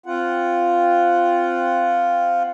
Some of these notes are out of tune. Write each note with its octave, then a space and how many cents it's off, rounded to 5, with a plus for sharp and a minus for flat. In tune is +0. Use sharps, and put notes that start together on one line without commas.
C4 +0 F4 +0 F#5 +5